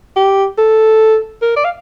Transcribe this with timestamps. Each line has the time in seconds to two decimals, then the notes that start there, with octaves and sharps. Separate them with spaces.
0.16 G4
0.58 A4
1.42 A#4
1.56 D5
1.64 F5